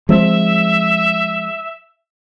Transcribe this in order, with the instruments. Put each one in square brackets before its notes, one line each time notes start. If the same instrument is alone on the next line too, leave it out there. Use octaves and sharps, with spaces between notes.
[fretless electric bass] F3 G#3 C4 [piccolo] E5